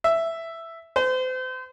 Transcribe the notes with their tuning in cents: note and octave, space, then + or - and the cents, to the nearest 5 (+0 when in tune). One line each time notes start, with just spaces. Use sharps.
E5 +5
C5 -35